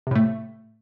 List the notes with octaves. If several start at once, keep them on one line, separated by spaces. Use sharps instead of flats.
A2 C3 A3